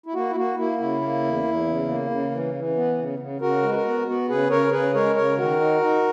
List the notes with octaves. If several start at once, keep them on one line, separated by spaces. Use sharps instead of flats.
E4
A#3 F#4
E4
A#3 F#4
A#3 E4
C#3 E4
A#3
E2
E2
C#3
A#3
C#3
E3
E3
B3
C#3
C#3
C#3 F#4 A#4
G#3
B4
F#4 A#4
B3
B3 F#4
C#3 G#4 B4
C#3 A#4 C#5
C#3 G#4 B4
G#3 A#4 C#5
C#3 A#4 C#5
D#3 F#4 A#4
D#4
D#4